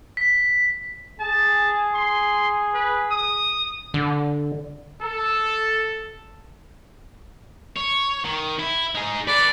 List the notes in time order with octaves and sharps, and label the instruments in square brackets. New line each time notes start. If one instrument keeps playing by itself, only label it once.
[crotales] B6
[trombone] G#4 [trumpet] A5
[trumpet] C6
B4
D#6
[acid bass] D3
[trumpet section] A4
[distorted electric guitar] C#5
D#3
E4
D#4 G#4
[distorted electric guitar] A4 B4 [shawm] D5